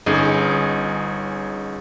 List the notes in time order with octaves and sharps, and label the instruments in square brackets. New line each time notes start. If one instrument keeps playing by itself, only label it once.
[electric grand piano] G1 C#4 D#4 G#4